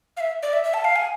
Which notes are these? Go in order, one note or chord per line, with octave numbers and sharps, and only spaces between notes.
F5
E5
D5
E5
E5
A5
F5
G#5